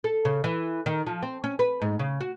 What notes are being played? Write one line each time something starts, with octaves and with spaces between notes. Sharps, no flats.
A4
C#3
E3
D#3
F3
C4
C#4
B4
G#2
C#3
F#4